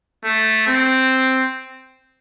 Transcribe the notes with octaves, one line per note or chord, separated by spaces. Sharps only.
A3
C4